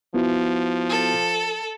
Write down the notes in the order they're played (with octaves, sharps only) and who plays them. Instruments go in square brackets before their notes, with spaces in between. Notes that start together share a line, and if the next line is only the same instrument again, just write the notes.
[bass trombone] F3 [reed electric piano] B3 E4 F#4
[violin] A4